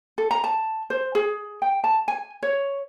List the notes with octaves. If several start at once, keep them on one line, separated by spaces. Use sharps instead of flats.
A4
A#5
A5
C5
G#4
G5
A5
G#5
C#5